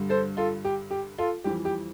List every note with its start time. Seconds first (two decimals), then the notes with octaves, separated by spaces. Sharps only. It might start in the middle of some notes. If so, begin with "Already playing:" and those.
Already playing: G2 D3 G3
0.09 A4 C5
0.37 F4 A4
0.65 G4
0.91 G4
1.18 F4 A4
1.44 F2 E3 G3 G4
1.65 G4